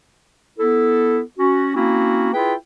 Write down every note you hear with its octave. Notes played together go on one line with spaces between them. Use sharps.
B3 E4 A4
C#4 F#4
A#3 C4 C#4 E4 F#4
E4 F4 G#4 B4 G5